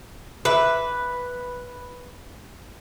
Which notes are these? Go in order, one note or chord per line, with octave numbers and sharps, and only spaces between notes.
B4 E5 D6